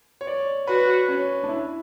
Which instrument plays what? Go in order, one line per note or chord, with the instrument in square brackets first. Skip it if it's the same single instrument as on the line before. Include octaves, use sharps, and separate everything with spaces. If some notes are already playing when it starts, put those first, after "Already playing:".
[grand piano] C#5
D5
[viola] F#4 [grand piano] B4
[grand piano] C#4
D4
E4